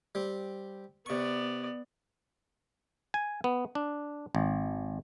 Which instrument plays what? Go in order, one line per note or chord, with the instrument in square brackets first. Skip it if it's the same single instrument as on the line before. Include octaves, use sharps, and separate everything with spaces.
[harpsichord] G3 C4
[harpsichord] C3 C#6 [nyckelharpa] B3 D5
[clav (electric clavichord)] G#5
B3
D4
G#1